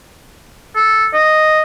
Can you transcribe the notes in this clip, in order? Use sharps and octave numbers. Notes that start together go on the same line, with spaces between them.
A4
D#5